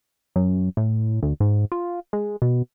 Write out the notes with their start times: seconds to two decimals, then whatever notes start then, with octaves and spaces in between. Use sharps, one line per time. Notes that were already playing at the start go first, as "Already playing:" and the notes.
0.36 F#2
0.77 A2
1.22 D2
1.40 G#2
1.72 F4
2.13 G#3
2.42 B2